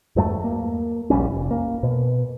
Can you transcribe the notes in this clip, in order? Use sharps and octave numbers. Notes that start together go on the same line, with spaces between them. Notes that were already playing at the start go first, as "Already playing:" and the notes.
E2 G2 F#3 A3
A#3
D#1 A#1 G3 C#4
F1
A#3
B2